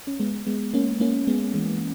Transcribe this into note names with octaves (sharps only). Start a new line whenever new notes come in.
C#4
G#3 B3
G#3 B3
A#3 C#4
A#3 C#4
G#3 B3
E3 G#3